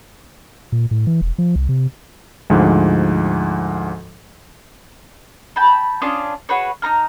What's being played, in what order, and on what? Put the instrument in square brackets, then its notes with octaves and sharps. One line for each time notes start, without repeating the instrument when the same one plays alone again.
[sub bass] A#2
A2
E3
E1
F3
C2
C3
[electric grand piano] D2 G#2 F3
[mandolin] G5 A5 B5
C#4 D4 F4 D#6
F#4 G#4 B4 C#5
D#4 F4 A#5 F6